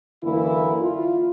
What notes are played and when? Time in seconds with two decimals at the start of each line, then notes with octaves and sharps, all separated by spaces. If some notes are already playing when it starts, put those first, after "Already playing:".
0.24 F#2 D3 E3 A#3 E4
0.82 F4